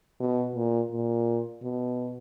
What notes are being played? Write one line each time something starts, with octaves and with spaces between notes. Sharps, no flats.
B2
A#2
A#2
B2